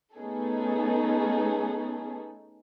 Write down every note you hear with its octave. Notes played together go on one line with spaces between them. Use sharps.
A3 B3 C#4 D#4 G#4 A4